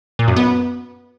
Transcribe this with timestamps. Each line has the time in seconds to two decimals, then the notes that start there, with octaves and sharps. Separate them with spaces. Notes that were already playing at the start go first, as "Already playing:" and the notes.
0.19 A#2
0.28 F#2
0.36 B3